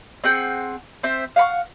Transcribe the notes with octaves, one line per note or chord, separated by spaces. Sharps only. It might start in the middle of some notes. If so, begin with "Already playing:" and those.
C4 G#4 F#5 G5
C4 C5 E5
F5 F#5 B5 C#6